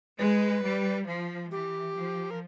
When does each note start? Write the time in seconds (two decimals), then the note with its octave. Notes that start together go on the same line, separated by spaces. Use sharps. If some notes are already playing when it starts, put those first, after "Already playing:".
0.19 G#3 B4
0.63 G3
1.07 F3
1.51 E3 G4
1.95 F3
2.30 A#4